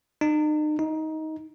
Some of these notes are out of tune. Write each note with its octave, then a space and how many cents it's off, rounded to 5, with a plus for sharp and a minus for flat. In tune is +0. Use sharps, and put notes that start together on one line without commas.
D#4 -40
D#4 +15